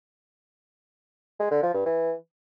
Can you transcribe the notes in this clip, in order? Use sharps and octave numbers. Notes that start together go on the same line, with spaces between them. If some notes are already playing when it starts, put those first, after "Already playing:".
G#3
D3
F3
G2
E3